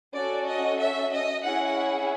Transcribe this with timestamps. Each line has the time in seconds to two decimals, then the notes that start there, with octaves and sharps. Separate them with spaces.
0.14 C#4 F#4 A4 D5
0.47 D#5
0.79 E5
1.13 D#5
1.45 C#4 E4 G#4 F#5